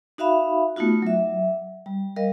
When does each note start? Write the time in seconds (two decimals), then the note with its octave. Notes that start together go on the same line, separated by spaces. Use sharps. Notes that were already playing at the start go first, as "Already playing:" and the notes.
0.18 D#4 F#4 E5 F5 B5
0.76 A3 B3 D#4 F4 F#4
1.02 F#3 E5
1.86 G3
2.16 G3 A#4 D#5 F5